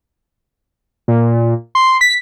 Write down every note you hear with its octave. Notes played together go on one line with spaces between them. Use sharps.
A#2
C6
B6